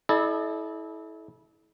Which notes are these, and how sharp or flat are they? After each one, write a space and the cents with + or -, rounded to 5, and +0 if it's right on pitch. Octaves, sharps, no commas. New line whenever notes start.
E4 -25 A4 -35 D5 +40